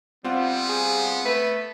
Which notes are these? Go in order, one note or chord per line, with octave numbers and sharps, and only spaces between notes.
G3 B3 C4 F4 F#5
G#4
A3 B4